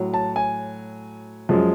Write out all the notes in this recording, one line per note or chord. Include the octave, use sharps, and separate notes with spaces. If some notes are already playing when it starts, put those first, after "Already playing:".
Already playing: A2 F#3
A5
G#5
F#2 F3 G#3